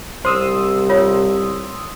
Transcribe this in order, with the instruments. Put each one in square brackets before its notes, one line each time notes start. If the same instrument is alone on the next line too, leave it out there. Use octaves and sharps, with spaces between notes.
[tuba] C2 [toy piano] C5 [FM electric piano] C6 D#6 E6
[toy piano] F4 C#5